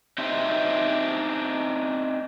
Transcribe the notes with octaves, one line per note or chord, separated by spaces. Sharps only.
C4 D4 D#4 C5 E5 G5